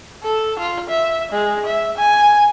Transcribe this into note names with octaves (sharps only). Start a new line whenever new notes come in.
A4
F4
E5
G#3
E5
G#5